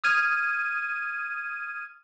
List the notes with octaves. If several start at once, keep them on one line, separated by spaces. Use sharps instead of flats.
D#6 F6 G#6 D#7